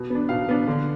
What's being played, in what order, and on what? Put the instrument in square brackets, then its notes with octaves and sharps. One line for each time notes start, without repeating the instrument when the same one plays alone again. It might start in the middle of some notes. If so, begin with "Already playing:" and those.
Already playing: [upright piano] B2
B3 D4
B2 F5
B3 D4
D3